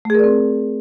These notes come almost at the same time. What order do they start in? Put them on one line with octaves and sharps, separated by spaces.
A3 G#4 A#4 D5 C4